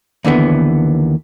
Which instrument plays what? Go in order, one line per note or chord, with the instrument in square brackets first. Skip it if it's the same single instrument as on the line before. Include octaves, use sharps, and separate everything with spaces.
[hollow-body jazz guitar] D#2 D3 E3 B3